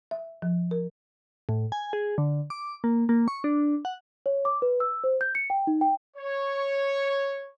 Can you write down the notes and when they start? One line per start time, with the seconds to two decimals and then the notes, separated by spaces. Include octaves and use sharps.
0.11 E5
0.42 F3
0.71 A#4
1.49 A2
1.72 G#5
1.93 G#4
2.18 D3
2.50 D6
2.84 A#3
3.09 A#3
3.28 C#6
3.44 D4
3.85 F#5
4.26 C#5
4.45 D6
4.62 B4
4.80 E6
5.04 C5
5.21 G6
5.35 C#7
5.50 G5
5.67 D#4
5.81 G5
6.17 C#5